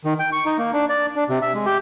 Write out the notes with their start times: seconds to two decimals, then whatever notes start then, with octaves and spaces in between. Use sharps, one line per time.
0.05 D#3
0.19 G5
0.32 C#6
0.45 D#4
0.58 A#3
0.73 D4
0.89 D5
1.16 D4
1.29 C3
1.42 E5
1.54 G#3
1.66 G4